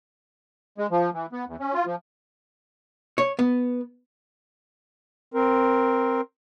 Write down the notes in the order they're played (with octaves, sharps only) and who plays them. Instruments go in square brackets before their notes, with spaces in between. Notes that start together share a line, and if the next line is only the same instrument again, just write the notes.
[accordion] G#3
F3
E3
B3
E2
C#4
F4
F3
[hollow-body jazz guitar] C#5
B3
[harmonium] C4 A#4